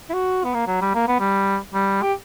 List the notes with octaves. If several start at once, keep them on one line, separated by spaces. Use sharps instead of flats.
E4
F#4
B3
A#3
F#3
G3
A#3
B3
G3
G3
G4